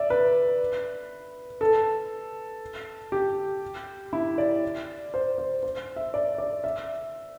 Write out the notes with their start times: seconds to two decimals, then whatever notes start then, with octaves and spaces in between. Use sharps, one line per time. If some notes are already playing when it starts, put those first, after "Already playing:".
Already playing: D5 E5
0.10 B4
1.61 A4
3.12 G4
4.13 E4
4.38 D5
5.14 C5
5.38 C5
5.63 C5
5.96 E5
6.14 D5
6.38 D5
6.64 E5